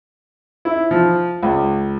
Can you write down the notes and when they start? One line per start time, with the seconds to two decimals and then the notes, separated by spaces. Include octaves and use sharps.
0.65 E4
0.91 F3
1.43 C#2